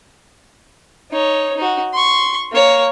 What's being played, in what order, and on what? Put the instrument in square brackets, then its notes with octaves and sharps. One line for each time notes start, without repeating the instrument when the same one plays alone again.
[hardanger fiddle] D#4 C#5
D#4 F#4
C6 C#6
A#3 C#5